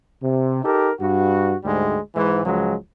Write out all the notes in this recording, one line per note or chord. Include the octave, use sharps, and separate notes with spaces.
C3
D#4 G4 A4 A#4
G2 F#4
D2 G#2 G3 G#3
G#2 E3
C#2 F3 F#3 G#3